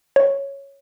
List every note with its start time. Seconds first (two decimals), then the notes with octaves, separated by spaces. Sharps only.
0.16 C#5